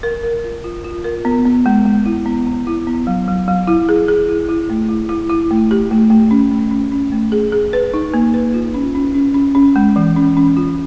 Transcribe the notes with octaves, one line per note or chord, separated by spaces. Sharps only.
A#4
A#4
F4
F4
F4
A#4
B3
B3
G#3
G#3
E4
B3
B3
E4
B3
F#3
F#3
F#3
E4
G#4
G#4
E4
E4
A3
E4
E4
E4
A3
G4
A3
A3
C#4
A3
C#4
C#4
A3
G#4
G#4
B4
D#4
A#3
B4
F4
C#4
C#4
C#4
C#4
C#4
G#3
E3
C#4
C#4
F4